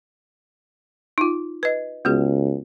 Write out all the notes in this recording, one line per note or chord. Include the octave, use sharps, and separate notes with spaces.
D#4 F4
B4 D#5
C#2 B3 F#4 G#4